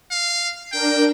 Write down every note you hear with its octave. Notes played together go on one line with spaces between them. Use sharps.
F5
D4 A#4 G5